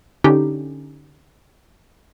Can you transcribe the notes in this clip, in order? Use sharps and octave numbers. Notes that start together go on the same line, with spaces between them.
D3 C#4 D#4 G4